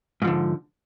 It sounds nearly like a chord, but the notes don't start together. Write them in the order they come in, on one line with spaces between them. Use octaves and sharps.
G#2 F3 D3